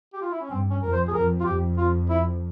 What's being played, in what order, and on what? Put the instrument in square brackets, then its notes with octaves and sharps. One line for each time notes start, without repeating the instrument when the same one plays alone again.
[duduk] G4
F4
E4
C#4
[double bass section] G2 [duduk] C4
[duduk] C#4
[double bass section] F2 [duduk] A#4
[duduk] C5
G#4
[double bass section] F2 [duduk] A#4
[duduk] F4
[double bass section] F2 [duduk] G4
[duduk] F4
E4